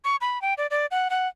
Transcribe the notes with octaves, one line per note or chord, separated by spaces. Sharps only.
C#6
B5
G5
D5
D5
F#5
F#5